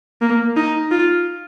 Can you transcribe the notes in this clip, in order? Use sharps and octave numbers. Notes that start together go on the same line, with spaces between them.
A#3
D#4
F4